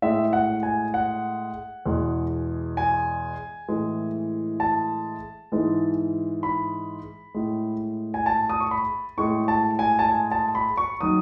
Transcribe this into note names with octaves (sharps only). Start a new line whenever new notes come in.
A2 G#3 E5
F#5
G#5
F#5
E2 B2 G#3
G#5
A2 E3 G#3
A5
G#2 E3 G#3
B5
A2 G#3
G#5
A5
D#6
C#6
B5
A2 G#3 C#6
A5
G#5
A5
G#5
A5
B5
C#6
D#3 F#3 D#6